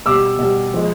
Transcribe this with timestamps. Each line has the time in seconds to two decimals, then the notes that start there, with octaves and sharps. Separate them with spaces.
0.06 B2 G3 D6 E6
0.39 B2 G3
0.74 F3 G#3